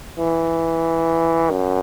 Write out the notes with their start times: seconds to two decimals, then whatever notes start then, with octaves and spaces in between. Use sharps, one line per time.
0.18 E3
1.51 F#2